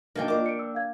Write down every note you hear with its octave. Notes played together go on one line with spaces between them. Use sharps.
F3 F#3 A#3 D4 D#4 G5
A#3 D4 F4 A#4 D#5 D6
C#7 D7
E6
F5 G#6